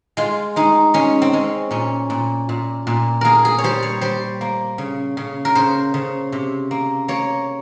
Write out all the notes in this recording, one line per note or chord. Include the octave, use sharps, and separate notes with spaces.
G#3 F4
G#3 D#4
G#3 C#4
C4
G#3 C#4
A#2 C#4
A#2
A#2
A#2
A#3 G#4 A#4
G#4
C#5
G3 C5
C#5
G3 C5
A#3
C#3
C#3
A#4
C#3 C5
C#3
C3
A#3
A#3 C#5